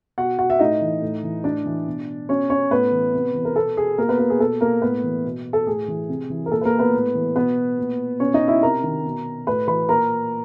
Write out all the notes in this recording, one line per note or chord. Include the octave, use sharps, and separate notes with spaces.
B2 F#4 F#5
F#4 F#5
E5
A2 D#4 D#5
E3
A2
E3
A2 D4 D5
E3
B2
B2 C#4 C#5
C#4 C#5
A2 B3 B4
E3
C3
E3
A#4
B2 A4
G#4
B2 A#3 A#4
B3 B4
A#3 A#4
G#4
B2 A4
A#3 A#4
A2 B3 B4
E3
B2
A4
A2 G#4
E3
C3
E3
A#4
A#2 A4
B4
A#3 A#4
B3 B4
A2
E3
B2 B3 B4
A#2
B2 C#4 C#5
D#4 D#5
E4 E5
C3 A#4 A#5
D#3
B2
A2 B4 B5
E3 B4 B5
A#2 A#4 A#5